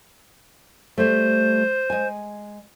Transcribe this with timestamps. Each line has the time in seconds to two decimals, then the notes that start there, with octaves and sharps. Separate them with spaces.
0.98 G3 A3 C5
1.90 G#3 G#5